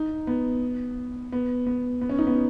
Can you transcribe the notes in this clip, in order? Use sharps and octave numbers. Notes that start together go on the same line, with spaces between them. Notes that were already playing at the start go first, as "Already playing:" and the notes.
Already playing: D#4
B3
B3
B3
B3
C#4
D#4
B3